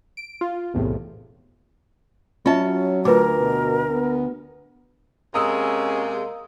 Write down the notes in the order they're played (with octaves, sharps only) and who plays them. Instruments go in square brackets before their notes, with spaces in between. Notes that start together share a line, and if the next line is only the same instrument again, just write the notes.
[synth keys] D7
F4
B1 E2 A2 C3
[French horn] F#3 [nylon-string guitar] C#4 A5 [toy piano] F4 D#5 E5
[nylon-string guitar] D2 [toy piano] F4 B4 D6 [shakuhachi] A#4
[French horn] B2
B3
[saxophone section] C3 G#3 [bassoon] A#3 [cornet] C#4 [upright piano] A#5 D#6 E6